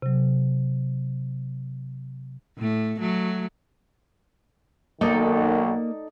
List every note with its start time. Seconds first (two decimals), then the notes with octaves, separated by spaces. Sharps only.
0.02 C3 F#3
2.57 A2 A3
2.99 F#3 A3
5.01 B1 D#3 F#3 A#3 D#4 A4 D5 D#5